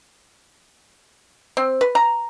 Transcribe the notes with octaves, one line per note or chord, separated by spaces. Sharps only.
C4
B4
A#5